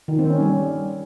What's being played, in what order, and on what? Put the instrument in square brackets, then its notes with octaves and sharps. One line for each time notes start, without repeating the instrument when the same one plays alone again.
[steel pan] D#3
C4
C#4
G3